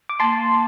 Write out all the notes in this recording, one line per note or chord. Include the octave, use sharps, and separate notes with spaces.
D6
A#3 A5 C6